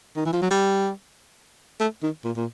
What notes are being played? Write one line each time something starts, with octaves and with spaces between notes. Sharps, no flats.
D#3
E3
F3
F#3
G3
A3
D#3
A#2
A#2